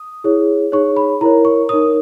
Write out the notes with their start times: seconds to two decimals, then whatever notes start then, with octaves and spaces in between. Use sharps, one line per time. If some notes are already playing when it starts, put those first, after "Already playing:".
Already playing: D#6
0.24 E4 G#4 C#5
0.72 D#4 G#4 C#5 C#6
0.97 B5
1.21 E4 A#4 C#5 A#5
1.45 C#6
1.69 D#4 A#4 C#5 D#6